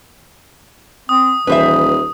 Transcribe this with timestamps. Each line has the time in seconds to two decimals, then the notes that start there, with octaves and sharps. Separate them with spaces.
1.09 C4 D#6
1.47 D#1 E3 B4 C5 E5